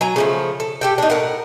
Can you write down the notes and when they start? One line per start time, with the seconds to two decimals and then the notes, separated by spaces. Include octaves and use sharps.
0.01 F#3 G#5 A#5
0.16 C#3 F3 A3
0.60 A4
0.81 G4 A4 G5
0.98 D4 D#4
1.10 A2 A#4 F#5